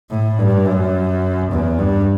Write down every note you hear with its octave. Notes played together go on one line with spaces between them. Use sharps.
A2
G2
F#2
E2
G2